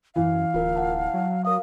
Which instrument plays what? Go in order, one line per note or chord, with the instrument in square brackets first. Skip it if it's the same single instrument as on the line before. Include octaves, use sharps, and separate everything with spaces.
[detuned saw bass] F#2 [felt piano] E3 [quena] F5
[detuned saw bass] D1 [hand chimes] F4 A#4
[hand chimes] F#5 A5
[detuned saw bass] F#3
[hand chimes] A#4 F5 [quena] D#6